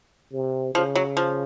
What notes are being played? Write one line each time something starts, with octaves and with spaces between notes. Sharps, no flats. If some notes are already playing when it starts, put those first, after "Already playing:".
C3
C#3 F3
F#3
F3